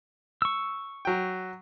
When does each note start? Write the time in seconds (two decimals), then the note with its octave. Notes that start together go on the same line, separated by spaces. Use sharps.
0.42 C#6 E6
1.05 F#3 G5